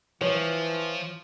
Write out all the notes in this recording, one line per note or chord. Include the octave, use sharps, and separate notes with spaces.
E3 F3 C#5